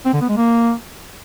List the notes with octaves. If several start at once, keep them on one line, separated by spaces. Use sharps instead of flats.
C4
D3
B3
G#3
A#3